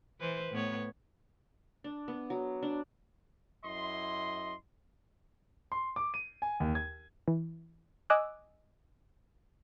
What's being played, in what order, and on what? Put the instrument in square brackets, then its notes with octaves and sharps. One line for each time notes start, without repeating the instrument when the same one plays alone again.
[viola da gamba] E3 B4 C5
A2 B3 C#5
[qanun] D4
B3
F#3
D4
[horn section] F#2 E4 D#5 C6
[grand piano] C6
D6
D#7
G#5
D#2
G#6
[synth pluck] E3
D#5 G#5 D6 E6 F#6